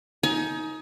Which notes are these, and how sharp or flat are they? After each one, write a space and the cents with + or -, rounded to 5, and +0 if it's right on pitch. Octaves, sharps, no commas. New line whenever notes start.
D#4 +20 G#5 +35